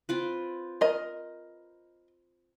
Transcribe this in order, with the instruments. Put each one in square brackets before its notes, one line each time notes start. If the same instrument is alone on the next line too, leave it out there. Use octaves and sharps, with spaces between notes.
[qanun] C4 F4 B4
[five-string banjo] A#4 D#5